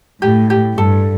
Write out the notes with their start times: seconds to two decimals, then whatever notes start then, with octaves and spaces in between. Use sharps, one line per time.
0.22 A2 G4
0.50 G4
0.77 G2 A4